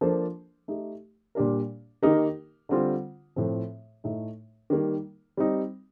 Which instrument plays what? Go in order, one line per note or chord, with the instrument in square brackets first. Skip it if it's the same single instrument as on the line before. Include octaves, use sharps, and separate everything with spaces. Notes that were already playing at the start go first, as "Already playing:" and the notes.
[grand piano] F3 A#3 D4 A4 C5
A3 D#4 G4
A#2 G3 D4 G4 A#4
D#3 A#3 D#4 G4 A#4
D3 G3 C4 F4 C5
A2 F3 C4
A2 A3 D#4
D#3 G3 A#3
G3 C4 D#4